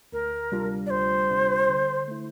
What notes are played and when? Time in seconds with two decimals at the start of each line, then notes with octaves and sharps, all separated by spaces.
0.12 D2 A#4
0.52 C3 G3 D4 F4
0.86 D5
0.90 D2 C5
1.29 C3 G3 D4 F4
1.69 D3
2.08 A3 E4